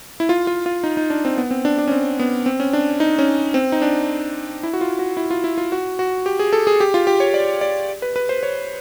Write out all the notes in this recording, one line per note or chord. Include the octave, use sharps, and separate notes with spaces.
E4
F4
F4
F4
D#4
D#4
D4
C4
B3
C4
D4
D4
C#4
C4
B3
C4
C#4
D4
D#4
C#4
C4
D#4
D4
E4
F#4
F4
F#4
E4
F4
E4
F4
F#4
F#4
G4
G#4
A4
G#4
G4
F4
G4
C#5
D5
D5
B4
B4
C5
C#5